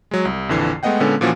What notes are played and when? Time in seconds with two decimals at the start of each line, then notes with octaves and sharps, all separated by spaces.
0.11 F#3 G#3
0.25 C2
0.49 A#1 F2 D3 E3 C7
0.83 G#3 A3 B3 D#5 F#5 G5
1.00 A#2 D3 G#3 B3 C#4 A4
1.21 A#2 E3 F3 A#3 C#4 F#4